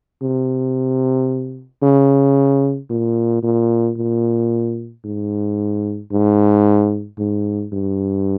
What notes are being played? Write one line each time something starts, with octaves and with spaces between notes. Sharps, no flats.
C3
C#3
A#2
A#2
A#2
G#2
G#2
G#2
G2